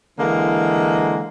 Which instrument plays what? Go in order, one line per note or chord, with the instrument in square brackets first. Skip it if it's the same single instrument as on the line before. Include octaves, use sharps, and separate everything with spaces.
[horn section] D3 E3 G#3 A#3